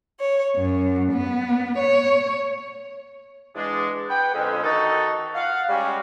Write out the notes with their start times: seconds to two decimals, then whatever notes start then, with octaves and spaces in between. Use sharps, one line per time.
0.20 C#5
0.57 F#2
1.13 B3
1.78 C#5
3.55 E2 G#3 D4
4.09 B4 F#5 G5
4.34 F2 D3 G#3 C#4
4.63 D#3 D#4 F#4 A4
5.35 F5 F#5
5.69 G3 G#3 C#4 F#4